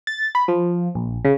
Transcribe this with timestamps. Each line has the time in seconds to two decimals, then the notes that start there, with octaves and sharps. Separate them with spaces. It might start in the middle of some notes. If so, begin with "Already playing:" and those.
0.07 A6
0.35 B5
0.48 F3
0.95 A#1
1.25 C#3